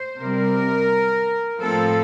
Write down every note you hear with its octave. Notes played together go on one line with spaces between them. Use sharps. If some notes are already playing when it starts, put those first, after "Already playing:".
Already playing: C5
C3 G3 C4 A#4
A2 F3 C4 A4